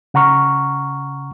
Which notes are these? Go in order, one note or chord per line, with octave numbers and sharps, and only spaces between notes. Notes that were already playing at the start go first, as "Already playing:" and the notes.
C#3 F#5 A#5 C#6 F6